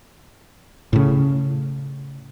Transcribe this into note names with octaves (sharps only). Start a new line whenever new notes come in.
A2 C#3